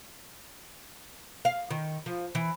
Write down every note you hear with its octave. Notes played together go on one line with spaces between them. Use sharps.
F5
D#3
F3
E3